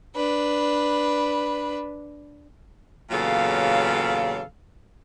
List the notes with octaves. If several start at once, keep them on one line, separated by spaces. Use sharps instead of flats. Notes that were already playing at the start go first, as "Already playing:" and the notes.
D4 B4
E2 A#2 C#3 F#3 A4 F5